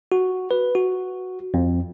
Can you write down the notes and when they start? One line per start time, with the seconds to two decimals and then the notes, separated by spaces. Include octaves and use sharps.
0.12 F#4
0.51 B4
0.75 F#4
1.54 F2